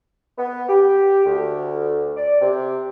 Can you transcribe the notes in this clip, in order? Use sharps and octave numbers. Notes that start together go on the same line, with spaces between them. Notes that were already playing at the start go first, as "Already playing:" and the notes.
B3
G4
D2
D5
C3